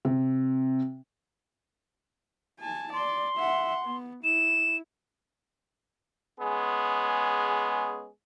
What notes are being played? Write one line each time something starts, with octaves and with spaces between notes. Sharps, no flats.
C3
G#5 A5
D5 C6
E5 F#5
B3
E4 E7
G#3 B3 C#4 G#4